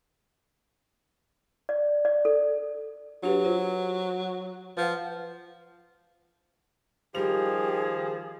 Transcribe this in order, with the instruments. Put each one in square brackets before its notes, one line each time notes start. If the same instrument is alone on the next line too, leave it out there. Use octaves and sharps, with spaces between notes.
[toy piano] D5
D5
A4
[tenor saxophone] F#3 [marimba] D4 G4 B4
[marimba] F4 C5
[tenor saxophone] F3 [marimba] B4 F#5
[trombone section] D#3 G4 [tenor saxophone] F3 [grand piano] G3 F7 [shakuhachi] G#4